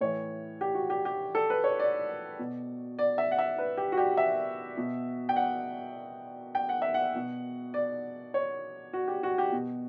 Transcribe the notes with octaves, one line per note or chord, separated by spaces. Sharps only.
A2 E3 C#5
G4
F#4
G4
G4
A4
B4
C#5
D5
B2
D5
E5
F#5
E5
B4
G4
F#4
G4
E5
B2
G5
F#5
G5
F#5
E5
F#5
B2
D5
C#5
F#4
G4
F#4
G4
B2